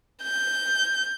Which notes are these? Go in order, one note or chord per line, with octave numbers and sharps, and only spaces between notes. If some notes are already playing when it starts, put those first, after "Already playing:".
G6